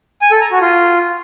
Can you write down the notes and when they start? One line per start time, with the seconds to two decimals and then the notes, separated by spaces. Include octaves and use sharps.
0.22 G#5
0.31 A4
0.41 A#5
0.51 F#4
0.61 F4